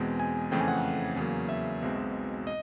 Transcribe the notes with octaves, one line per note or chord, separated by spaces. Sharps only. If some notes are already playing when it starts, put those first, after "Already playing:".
Already playing: E2 B2 G#3 C4
G#5
F2 C#3 E3 A3 C4 G5
G#5
F#5
E2 C#3 F#3 A#3
E5
B1 B2 G#3 C4
D#5